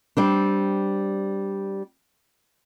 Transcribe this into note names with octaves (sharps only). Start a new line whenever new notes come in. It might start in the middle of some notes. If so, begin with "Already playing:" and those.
G3 C4 D4